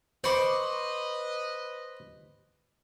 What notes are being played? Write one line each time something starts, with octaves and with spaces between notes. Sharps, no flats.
B4 C5 D#5 B5 C#6 D6